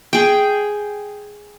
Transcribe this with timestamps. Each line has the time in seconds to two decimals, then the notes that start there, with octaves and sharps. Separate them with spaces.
0.13 G#4 G5